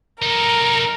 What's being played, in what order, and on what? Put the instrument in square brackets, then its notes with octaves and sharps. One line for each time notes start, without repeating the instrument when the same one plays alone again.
[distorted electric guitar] D#4 A4 [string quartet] A#4